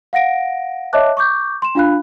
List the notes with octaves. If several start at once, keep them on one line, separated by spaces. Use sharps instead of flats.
F5 F#5 A#6 D7
C#5 D#5 E5 A5 D6 F#6
C#6 D6 G6
C6 E7
D4 F4 F5 B5 F#6